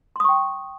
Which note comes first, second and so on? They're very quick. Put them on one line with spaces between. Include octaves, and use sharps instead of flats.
C6 D#6 C#6 G5